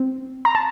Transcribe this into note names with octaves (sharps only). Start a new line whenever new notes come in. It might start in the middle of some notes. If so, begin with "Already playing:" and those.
Already playing: C4
A#5
A5